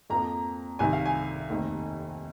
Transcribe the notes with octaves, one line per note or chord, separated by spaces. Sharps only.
F2 F3 A#3 A#5
C2 C3 D#3 G#5
F5
G#5
F1 D#2 D#3